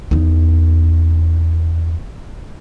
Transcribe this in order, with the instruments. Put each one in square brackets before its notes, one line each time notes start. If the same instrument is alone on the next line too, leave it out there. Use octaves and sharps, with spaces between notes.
[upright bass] E2 D#4